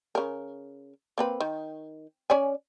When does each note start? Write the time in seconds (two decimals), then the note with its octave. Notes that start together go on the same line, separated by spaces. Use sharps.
0.15 C#3 A#4
1.18 A#3 C4 B4
1.40 D#3
2.30 C#4 D5 G#5